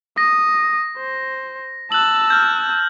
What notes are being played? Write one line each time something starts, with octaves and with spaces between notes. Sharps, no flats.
D#6 A#6
C5
A5 E6 F#6 F#7
F6 G6